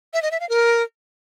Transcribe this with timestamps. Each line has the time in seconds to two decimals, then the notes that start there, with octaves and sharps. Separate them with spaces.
0.13 E5
0.22 D#5
0.31 E5
0.40 F5
0.49 A#4